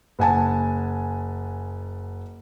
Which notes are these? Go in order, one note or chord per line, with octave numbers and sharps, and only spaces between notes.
F#1 F#5 G#5 A5